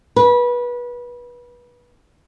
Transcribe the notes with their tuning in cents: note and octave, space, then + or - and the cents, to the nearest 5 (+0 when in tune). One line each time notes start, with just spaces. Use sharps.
B4 -25